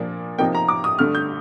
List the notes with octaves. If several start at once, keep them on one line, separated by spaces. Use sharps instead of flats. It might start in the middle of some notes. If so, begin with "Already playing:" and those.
Already playing: A#2 F3 A#3 D4
C3 F3 A#3 D#4 G5
A#5
D6
D#6
G2 D3 A3 F6
G6